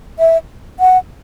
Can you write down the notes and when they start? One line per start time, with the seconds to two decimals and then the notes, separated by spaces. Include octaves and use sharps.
0.19 E5
0.80 F#5